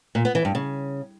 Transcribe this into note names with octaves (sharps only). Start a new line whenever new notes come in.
A#2
B3
E3
G2
C#3